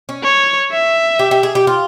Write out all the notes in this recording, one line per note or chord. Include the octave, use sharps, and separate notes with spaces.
C#4
C#5
E5
G4
G4
G#4
G4
F4